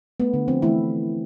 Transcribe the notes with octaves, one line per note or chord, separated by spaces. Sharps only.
A3 B3
D3
F3 C4
E3 A3 E4